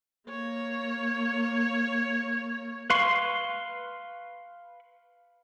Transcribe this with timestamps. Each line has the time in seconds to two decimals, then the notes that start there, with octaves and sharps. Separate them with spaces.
0.29 A#3 C#5
2.90 B4 F5 C6 C#6